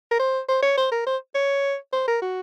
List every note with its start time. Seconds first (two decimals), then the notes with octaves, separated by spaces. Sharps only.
0.11 A#4
0.19 C5
0.49 C5
0.63 C#5
0.77 C5
0.92 A#4
1.06 C5
1.35 C#5
1.93 C5
2.08 A#4
2.22 F#4